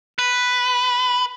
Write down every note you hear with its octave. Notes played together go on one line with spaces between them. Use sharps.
B4